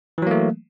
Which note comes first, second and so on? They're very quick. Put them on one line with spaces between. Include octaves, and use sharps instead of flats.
E3 F#3 A#3 A3